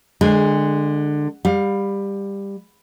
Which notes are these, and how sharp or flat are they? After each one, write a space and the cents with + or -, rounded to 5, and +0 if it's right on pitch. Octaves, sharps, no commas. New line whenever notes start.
D3 +20 G#3 +0 G#5 -30
G3 +15 F5 +30